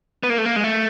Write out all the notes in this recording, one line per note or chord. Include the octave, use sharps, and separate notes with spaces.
B3
A#3
A3
A#3
G#3
A3